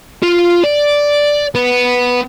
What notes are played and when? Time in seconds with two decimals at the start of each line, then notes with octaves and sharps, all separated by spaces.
0.23 F4
0.64 D5
1.55 B3